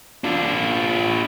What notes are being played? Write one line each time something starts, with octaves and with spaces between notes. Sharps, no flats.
D4 F4